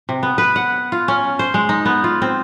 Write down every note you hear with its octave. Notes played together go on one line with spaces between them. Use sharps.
C3
B3
B4
F#5
F4
C#4
C5
G#3
D#4
B3
F4
C4